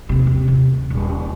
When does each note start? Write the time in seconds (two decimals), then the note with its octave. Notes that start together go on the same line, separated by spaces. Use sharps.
0.09 D#2 C3
0.27 C3
0.48 D#1
0.90 D#1